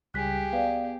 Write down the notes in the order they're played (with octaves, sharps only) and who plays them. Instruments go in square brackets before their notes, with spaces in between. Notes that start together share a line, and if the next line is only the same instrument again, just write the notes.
[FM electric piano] C#2 G3 [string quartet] G4 G#4 [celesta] F#6 B6
[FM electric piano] B3 [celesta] D5 F5